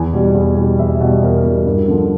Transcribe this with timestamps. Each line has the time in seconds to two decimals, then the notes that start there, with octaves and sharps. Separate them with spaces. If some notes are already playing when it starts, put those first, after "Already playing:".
Already playing: E2 G#5
0.13 B2 G3
0.34 E2
0.56 B2 G3
0.79 E2 E5
1.00 B2 G3
1.23 E2 A#4
1.44 B2 G3
1.66 G2 A#4
1.88 D3 F3 A4